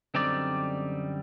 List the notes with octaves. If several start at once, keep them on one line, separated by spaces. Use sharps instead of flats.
F#2 D3 G3 C4 D#4 D5